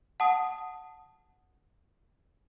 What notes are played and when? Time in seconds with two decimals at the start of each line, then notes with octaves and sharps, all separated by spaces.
0.20 F#5 A5 D#6